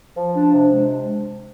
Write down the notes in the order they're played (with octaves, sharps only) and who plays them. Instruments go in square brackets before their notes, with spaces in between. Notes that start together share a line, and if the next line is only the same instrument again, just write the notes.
[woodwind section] F3
D4
C3
G#3